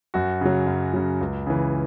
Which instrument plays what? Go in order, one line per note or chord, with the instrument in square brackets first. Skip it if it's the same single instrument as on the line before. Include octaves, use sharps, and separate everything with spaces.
[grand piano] F#2 F#4
C#3 F#3
F#2
C#3 F#3
C#2
C#3 E3